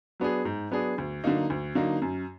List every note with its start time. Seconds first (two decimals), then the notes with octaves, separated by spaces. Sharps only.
0.20 F#3 B3 D4 G#4
0.45 G#2
0.71 F#3 B3 D4 G#4
0.98 D2
1.24 D3 F#3 A#3 D#4
1.50 D2
1.75 D3 F#3 A#3 D#4
2.02 F#2